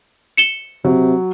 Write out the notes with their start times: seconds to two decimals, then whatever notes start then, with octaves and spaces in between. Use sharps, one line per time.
0.37 C#7 E7 G7
0.85 C3 F#3